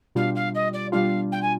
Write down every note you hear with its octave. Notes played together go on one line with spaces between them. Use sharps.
B2 G3 D4 F4 F5
F5
D#5
D5
B2 G3 D4 F4 F5
G5
G#5